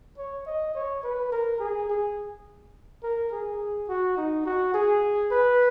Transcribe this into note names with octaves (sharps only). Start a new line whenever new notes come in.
C#5
D#5
C#5
B4
A#4
G#4
G#4
A#4
G#4
F#4
D#4
F#4
G#4
B4